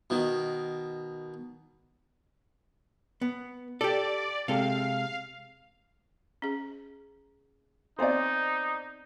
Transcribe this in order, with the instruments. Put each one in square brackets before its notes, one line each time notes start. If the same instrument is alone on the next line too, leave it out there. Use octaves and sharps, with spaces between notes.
[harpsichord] B2 D#3
[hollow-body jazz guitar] B3
[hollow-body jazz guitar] G4 A4 [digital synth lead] D5
[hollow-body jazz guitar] C3 G#3 A4 [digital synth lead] F5
[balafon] C#4 G#4
[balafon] B3 C4 [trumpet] D#4 [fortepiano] C5 D5